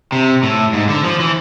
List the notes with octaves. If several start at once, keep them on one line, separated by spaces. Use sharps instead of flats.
C3
A2
G#2
D3
F3
E3